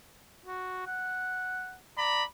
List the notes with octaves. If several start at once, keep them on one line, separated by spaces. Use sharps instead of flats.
F#4
F#5
D5 A#5 B5